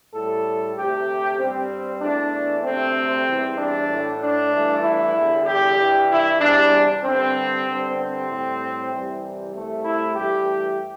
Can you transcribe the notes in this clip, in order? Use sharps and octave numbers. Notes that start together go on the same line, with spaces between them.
A2 G3 A4
D2 C3 A3 G4
G2 G3 C4
E2 E3 A3 D4
D2 C3 A3 C4
E2 E3 G3
D4
A2 A3
D4
G2 E3 A3
E4
E2 D3 G3
G4
G2 E3 G3
E4
E2 C3 E3 G3 D4
G2 D3 G3 C4
G2 D3 G3
C4
A2 G3
C2 C3 E3 G3
C2 C3 A3
E4
G2 E3 A3 G4